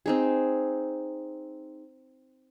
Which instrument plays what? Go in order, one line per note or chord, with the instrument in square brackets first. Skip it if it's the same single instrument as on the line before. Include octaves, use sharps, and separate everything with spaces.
[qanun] C4 D#4 G#4